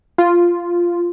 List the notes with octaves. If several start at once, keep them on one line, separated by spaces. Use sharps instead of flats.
F4